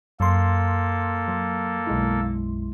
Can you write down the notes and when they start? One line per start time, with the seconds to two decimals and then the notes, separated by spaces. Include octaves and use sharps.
0.20 F#2 A#3 A4 C6
1.28 F#3
1.87 B1 G#3 E4